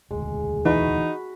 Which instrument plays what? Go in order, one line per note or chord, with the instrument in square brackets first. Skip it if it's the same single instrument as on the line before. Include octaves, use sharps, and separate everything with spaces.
[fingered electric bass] E1 D2 [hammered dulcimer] G#3
[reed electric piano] E3 [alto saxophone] D#4 [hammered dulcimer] F#4 B5